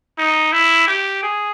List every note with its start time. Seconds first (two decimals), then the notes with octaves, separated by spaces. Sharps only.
0.18 D#4
0.52 E4
0.88 G4
1.23 G#4